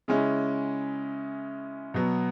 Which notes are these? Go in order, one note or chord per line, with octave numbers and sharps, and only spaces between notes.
C#3 G#3 C#4 E4
B2 F#3 B3